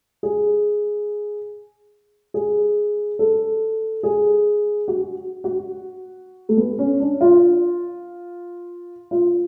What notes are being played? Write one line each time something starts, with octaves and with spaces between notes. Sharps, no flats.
G#4
G#4
A4
G#4
F#4
F#4
A3
B3
C#4
D4
F4
F4